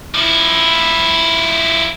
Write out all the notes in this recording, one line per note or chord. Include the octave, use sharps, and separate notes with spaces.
F3 E4